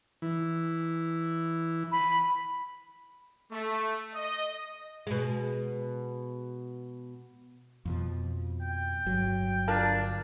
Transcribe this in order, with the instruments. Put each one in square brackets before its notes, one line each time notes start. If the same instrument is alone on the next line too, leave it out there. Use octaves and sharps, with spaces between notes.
[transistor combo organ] E3
[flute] B5
[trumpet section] A3
D#5
[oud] B2 G#3
[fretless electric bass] F2 B2 F3
[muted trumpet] G5
[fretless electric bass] G1 F#3
[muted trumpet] D4 [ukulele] F4 A#4 A5